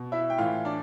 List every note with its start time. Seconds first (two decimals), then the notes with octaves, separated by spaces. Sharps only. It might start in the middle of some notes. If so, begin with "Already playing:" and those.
Already playing: B2
0.12 E4 E5
0.30 G5
0.38 A2 E3 F4 F5
0.65 D4 D5